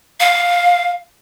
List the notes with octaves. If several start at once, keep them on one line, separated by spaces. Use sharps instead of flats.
F5